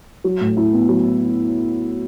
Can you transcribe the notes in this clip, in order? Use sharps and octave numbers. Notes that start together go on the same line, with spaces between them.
F#3
A2
E4
B3
F#3